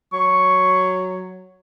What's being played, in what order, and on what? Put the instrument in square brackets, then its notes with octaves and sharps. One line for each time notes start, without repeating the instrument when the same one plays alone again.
[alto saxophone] F#3 [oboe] C#6